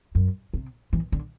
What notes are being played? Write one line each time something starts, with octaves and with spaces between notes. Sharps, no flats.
F#2
C3
E3
D3